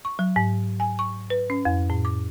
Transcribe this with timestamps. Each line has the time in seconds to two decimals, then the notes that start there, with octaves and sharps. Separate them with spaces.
0.05 C#6
0.19 F#3
0.36 G#2
0.80 G#5
0.99 C#6
1.30 B4
1.50 C#4
1.65 F2
1.90 A2
2.05 D6